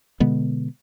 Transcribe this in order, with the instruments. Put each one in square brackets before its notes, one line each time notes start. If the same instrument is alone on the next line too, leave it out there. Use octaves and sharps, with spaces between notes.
[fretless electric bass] B2 D3 G#3 B3